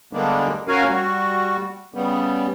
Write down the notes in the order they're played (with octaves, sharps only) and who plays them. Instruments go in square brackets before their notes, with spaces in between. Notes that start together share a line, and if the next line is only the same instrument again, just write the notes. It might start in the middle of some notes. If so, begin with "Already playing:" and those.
[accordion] D3 G3 G#3 A#3 B3 D4
C#4 F#4 A#4 F5 G#5
G3 F#4
C#3 G3 B3